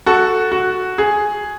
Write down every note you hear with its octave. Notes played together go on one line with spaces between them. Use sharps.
F#4 A4
F#4
G#4